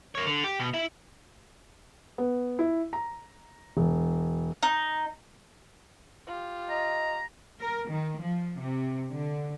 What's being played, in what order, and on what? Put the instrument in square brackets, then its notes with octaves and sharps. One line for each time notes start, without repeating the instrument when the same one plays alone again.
[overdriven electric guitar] A#4 C#5
D3
G4
B2
E4 E5
[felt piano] B3
E4
A#5
E1
[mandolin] D#4
[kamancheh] F4 G4
[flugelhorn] D#5 [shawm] A#5
[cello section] A#4
D#3
F3
C3
D3